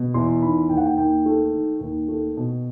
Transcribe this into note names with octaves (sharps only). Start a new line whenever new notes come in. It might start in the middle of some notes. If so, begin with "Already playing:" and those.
Already playing: B2
E2 C6
D#3 B5
D#2 G5
F#5
G5
D#2 G5
A3
D#3
D#2
A3
B2